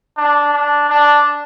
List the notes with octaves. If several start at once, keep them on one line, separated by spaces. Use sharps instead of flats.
D4
D4
D4